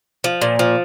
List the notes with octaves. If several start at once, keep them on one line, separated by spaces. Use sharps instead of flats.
F3
A#2
F3